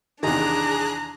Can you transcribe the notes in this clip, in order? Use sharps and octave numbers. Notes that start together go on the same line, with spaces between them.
E2 C3 D#3 D4 G#4 A#5 F#6